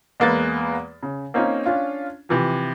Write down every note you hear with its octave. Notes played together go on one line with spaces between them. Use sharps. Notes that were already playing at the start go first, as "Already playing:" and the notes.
E2 G#3 A#3 B3 B4 A6
C#3
A#3 C4 C#4 D#4 F4
C#4 D4 F4
C3 E3 F3